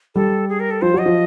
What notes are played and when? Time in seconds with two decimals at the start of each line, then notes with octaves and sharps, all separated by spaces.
0.15 G3 A4
0.49 G#4
0.60 A#4
0.71 A4
0.82 F3 C5
0.94 F#3
0.99 D#5
1.06 F3